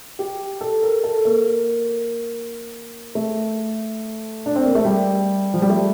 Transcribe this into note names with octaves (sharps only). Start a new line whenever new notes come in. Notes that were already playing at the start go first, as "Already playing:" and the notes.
G4
A4
A#4
A4
A#3
A3
D4
C4
A#3
A3
G3
F3
G3
A3